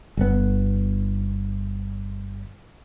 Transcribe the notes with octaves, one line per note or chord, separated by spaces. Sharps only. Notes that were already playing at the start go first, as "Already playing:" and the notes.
G1 B3